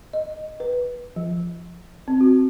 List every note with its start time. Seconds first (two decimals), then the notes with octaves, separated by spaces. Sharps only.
0.13 D#5
0.60 B4
1.16 F3
2.08 C4
2.21 F#4